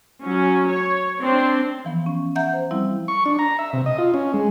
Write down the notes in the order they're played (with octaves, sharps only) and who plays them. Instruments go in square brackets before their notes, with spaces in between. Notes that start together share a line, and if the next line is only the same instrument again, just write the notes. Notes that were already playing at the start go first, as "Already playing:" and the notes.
[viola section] F#3 C#4
C#5
C4 D4 C6
[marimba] E3 F3 B3
C#4
E5 F#5 A#5 G6
C5
F3 G3 C4 E4
[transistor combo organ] C#6
D4
A#5
E5
C3
D#5
F4
C#4
G#3